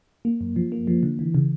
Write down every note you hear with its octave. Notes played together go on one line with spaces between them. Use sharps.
A#3
F#2
F3
A#3
F3
D3
E3
C#3